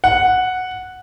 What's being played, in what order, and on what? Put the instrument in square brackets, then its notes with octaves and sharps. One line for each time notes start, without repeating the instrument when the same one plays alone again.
[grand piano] F#5